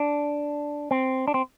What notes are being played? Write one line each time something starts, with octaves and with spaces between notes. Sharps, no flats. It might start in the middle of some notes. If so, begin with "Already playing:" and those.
Already playing: D4
C4
D4
C4